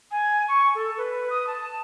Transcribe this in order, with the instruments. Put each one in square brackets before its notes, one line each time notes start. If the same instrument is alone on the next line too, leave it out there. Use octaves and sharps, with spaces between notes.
[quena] G#5
C#6
A4
B4
D#6
A5